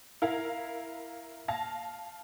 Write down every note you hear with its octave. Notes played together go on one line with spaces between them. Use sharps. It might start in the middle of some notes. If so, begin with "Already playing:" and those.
E4 A#4 F5
F5 A5 A#6